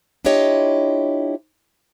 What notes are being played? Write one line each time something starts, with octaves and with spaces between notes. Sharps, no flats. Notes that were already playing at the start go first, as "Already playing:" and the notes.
D4 E4 F4 G4 C#5 D#5